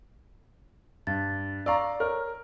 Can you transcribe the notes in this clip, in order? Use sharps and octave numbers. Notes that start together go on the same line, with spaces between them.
G2 A6
D5 F5 A#5 C#6 E6
A#4 C#5